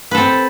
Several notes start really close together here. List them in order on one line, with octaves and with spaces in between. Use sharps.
B4 A4 C4